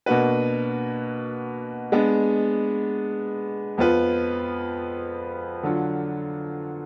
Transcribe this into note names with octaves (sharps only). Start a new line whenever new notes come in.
B2 A#3 D4 F#4 B4
G#3 B3 D4
F2 F3 B3 F4 B4
D3 F#3 D4 F4